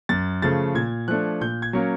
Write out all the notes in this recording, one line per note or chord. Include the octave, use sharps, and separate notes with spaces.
F#2 A6
C#3 F3 A3 A6
A#2 G#6
F3 A3 D4 F#6
A#2 G6
G#6
F#3 A#3 C#4